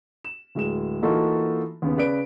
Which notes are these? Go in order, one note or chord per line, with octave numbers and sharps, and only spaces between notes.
E7
D1 G#3 E7
E3 A#3 D#4 F4 F#4 A4
D#2 C#3 B3
C#3 B4 D5 B5 D7